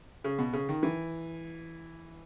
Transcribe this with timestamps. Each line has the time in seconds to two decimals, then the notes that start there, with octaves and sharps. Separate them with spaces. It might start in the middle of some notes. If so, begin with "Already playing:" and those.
0.24 C#3
0.39 B2
0.53 C#3
0.69 D#3
0.83 E3